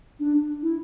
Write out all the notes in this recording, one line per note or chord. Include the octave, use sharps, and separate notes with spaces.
D4
E4